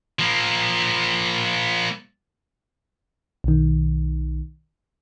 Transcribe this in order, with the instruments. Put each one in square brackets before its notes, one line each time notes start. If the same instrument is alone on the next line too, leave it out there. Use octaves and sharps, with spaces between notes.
[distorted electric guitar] F3 A#3
[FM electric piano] B1 D#3